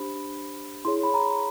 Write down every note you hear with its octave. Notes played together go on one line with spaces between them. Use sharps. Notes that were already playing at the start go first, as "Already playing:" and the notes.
Already playing: D4 G4 C5 B5
E4 G#4 C#5 C6
B5
A#5